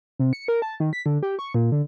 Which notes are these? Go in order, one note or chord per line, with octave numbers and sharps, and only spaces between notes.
C3
C#7
A#4
A5
D#3
B6
D3
G4
C#6
A#2
D3